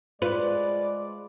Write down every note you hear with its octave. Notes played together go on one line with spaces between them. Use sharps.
G#3 F4 B4 D5